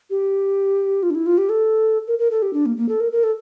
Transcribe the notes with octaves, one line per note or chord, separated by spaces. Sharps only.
G4
F4
D4
E4
F4
G4
A4
A#4
A#4
A4
G4
D4
A#3
A#3
A4
A#4
A#4
A4